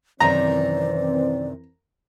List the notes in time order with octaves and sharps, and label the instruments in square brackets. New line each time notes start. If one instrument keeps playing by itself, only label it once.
[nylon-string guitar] F#2 C3 D#3 [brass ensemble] E3 C4 [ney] D5 [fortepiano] A#5